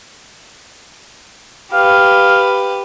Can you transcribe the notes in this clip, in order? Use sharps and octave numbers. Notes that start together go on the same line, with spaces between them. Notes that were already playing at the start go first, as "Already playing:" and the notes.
G4 B4 F5